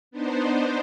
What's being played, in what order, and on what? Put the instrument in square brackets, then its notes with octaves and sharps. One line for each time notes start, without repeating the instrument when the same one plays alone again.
[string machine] B3 D4 D#4 C5